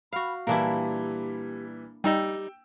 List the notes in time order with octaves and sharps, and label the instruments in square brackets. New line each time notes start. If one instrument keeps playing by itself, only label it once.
[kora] F#4 F5 [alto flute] B5
[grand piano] A#2 E3 G3 [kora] A#3 D4 E4 [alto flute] G4
[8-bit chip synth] G3 D#4 D#5 [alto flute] G4 [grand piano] G5 E6